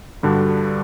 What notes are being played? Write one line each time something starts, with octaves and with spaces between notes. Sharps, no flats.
G2 D3 G3 D4 F#4